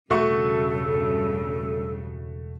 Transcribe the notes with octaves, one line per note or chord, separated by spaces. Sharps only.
E1 G2 C#3 A3 F#4 A4 C#6